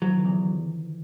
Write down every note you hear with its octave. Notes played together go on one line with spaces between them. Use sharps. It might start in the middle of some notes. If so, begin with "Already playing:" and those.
D#3 F3 F#3
D3 E3
E2